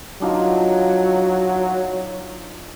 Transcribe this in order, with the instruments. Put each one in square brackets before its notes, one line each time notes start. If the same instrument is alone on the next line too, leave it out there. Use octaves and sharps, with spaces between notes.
[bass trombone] F#3 [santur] D4 D#4 F4